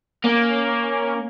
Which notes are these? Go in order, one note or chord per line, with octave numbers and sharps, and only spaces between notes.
A#3 C#4